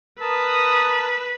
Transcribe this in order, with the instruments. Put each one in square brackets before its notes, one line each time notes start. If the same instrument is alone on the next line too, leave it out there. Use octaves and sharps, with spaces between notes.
[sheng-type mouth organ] A#4 A5 [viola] B4 [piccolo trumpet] D#6